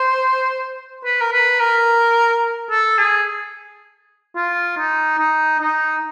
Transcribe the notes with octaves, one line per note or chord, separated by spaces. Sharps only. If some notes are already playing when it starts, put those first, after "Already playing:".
Already playing: C5
B4
A#4
B4
A#4
A4
G#4
F4
D#4
D#4
D#4